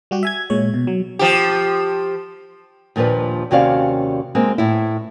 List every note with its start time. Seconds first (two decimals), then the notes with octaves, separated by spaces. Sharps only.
0.11 G3 F#4 G4
0.23 E5 G#5 G#6
0.50 A#2 G#3 C#5
0.74 B2
0.87 F#3
1.19 F3 G4
2.96 D#2 A#2 F3 D4 B4
3.51 D#2 C3 C#4 F#4 D5 F5
4.35 G#3 A#3 C4
4.58 A2 E4